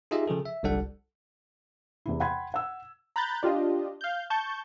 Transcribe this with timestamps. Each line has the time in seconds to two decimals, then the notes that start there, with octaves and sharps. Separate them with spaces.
0.11 D#4 F4 G4 G#4 D#5 E5
0.28 C#3 F3 G#4 A4
0.46 E5
0.63 G1 C2 G3 D4 A4 F#5
2.06 E2 C3 E4
2.20 F#5 G5 B5 C6 G#6
2.54 F#5 E6
3.16 A#5 B5 F#6 G6 A6
3.43 D4 F4 G4 D#5
4.01 F5 G6
4.30 A5 C#6 G6